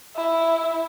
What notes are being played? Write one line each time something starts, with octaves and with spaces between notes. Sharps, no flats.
E4